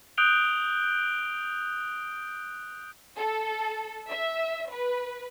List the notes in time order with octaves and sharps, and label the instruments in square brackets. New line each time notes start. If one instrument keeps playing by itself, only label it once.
[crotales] D#6 F#6 G6 D7 F7 G7
[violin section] A4
E5
B4